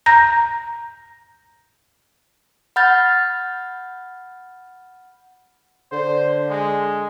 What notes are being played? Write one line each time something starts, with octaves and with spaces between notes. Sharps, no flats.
A#5 G6 A#6
F#5 B5 F6 G6 A6
D3 C5
G#3